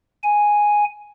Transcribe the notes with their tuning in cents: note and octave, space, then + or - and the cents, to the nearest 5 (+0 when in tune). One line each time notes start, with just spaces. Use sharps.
G#5 +0